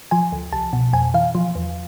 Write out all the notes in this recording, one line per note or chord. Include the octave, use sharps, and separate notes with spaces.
F3 G#5
D2
C2 A5
B2
F2 G#5
E3 F5
F3
E2